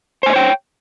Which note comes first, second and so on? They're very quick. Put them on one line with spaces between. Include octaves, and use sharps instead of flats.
C5 G#5 D#5 C#5 G5